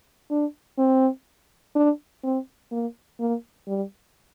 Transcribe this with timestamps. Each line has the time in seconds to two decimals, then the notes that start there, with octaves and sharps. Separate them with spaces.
0.31 D4
0.78 C4
1.76 D4
2.24 C4
2.72 A#3
3.20 A#3
3.68 G3